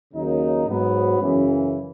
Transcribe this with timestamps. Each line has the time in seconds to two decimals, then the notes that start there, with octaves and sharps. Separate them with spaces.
0.13 D#2 C#3 F#3 A#3 D#4
0.67 G#2 F#3 B3
1.20 F#2 C#3 E3